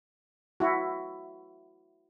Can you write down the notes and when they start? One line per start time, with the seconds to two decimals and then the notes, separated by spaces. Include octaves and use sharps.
0.60 E4 F#4